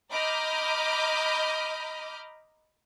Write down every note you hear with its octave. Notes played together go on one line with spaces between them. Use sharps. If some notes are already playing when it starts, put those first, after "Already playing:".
D#5 A#5 B5 D6 F6 G6